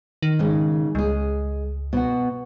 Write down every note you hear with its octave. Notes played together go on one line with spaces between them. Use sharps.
D#3
G#2 C#3
C#2 G#3 G#4
B2 F#4